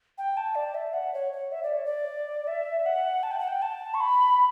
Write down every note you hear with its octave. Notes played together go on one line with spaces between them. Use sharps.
G5
A5
D5
E5
F#5
C#5
C#5
E5
D5
C#5
D5
E5
F#5
A5
G5
F#5
G5
A5
C#6
B5